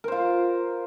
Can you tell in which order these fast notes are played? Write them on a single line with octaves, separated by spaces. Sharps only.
A#4 C5 F4